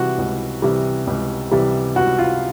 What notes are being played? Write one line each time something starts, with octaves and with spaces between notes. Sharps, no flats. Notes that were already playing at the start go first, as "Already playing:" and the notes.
Already playing: C3 E3 G3 F#4
C#2
C3 E3 G3
C#2
C3 E3 G3
C#2 F#4
F4